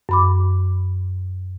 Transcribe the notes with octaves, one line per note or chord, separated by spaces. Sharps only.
F#2 B5 D6